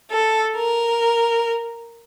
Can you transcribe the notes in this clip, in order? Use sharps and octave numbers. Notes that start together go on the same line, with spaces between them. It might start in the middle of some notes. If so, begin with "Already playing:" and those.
A4
A#4